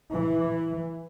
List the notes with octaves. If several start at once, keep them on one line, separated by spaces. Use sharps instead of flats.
E3